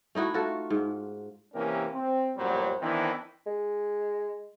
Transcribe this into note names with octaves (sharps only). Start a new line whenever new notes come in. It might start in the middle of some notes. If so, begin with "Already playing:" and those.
A3 D#4 E4 F#4
F4 F#4 A4
G#2
C3 E3 A#3 C#4 G4 A#4
C4
A1 F#2 A#2 F#3 G3 C5
D#3 E3 B3 C4 D4 E4
G#3